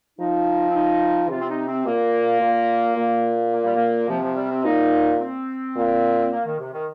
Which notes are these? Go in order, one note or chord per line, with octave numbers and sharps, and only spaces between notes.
F3 D#4
C4
D#4
C3 F4
C4
D#4
C4
A#2 A#3
A#2
A#2
A#3
G3
A#3
C3 F3
F3
G3
C4
A#2 D#4
C4
A#2
C4
A#3
D#3
C3
D#3